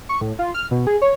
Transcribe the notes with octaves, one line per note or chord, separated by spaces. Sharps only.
C#6
A2
F4
F6
B2
G#4
C#5